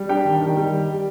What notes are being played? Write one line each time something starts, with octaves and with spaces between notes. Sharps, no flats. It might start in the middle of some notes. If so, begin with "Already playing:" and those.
Already playing: G3
D4 G4 G5
D#3
D#3
G3